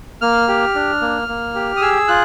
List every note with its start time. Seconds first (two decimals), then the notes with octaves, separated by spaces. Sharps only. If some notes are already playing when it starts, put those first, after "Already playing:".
0.21 A#3 F6
0.48 G4
0.75 D4
1.01 A#3
1.28 A#3
1.55 G4
1.76 D#6
1.81 G#4 E6
2.08 F4 F#6